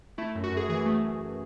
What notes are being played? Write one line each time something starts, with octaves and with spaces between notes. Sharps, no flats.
A3 E4
F#2
F#4
F#2
G#4
E3 G#4
A3